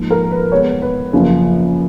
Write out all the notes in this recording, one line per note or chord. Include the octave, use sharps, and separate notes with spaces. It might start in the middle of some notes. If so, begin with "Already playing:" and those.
Already playing: G#2 F3 A#3
A#4
B4
B2 G#3 B3 C#5
B4
F#2 C#3 F3 A#3